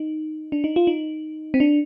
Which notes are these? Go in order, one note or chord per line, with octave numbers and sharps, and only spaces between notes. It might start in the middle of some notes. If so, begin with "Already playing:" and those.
Already playing: D#4
D4
D#4
F4
D#4
C4
D4